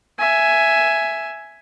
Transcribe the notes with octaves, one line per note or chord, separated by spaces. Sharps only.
E5 G#5